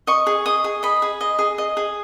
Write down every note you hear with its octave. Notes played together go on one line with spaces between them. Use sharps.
D#5 C#6
G#4
D#5 D#6
G#4
D#5 B5
G#4
D#5
G#4
D#5
G#4